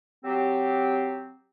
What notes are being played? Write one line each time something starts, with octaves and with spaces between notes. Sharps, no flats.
F#3 C4 G4